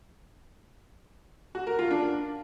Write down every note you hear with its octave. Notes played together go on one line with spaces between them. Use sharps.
F#4
A#4
F4
D4